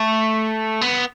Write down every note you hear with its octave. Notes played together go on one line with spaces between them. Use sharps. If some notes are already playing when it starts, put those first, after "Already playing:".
Already playing: A3
B3